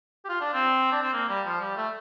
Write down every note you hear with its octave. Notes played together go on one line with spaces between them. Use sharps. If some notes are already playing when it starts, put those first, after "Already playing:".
G4
F4
D4
C4
D4
C4
A#3
G3
F3
G3
A3